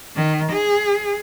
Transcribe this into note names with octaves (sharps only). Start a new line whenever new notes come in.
D#3
G#4